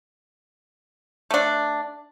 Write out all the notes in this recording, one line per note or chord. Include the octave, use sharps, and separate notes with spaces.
A3 D4